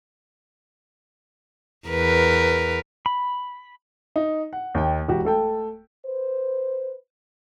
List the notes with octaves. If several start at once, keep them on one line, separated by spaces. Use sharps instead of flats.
E2 A#4 B4
B5
D#4
F#5
D#2 D#4 G5
E1 F#4 G4
A3 A4 G5
B4 C5